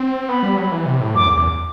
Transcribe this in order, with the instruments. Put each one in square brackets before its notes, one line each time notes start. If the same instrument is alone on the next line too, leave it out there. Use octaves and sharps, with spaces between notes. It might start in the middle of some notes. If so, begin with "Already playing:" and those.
Already playing: [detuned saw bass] C4
[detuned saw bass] B3 [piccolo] B5
[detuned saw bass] G3
F#3
E3
C3
A2
[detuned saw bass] F#2 [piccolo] D6
[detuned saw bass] E2
E2